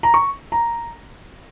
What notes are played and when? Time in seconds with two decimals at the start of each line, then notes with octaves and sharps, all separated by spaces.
0.03 A#5
0.14 C#6
0.52 A#5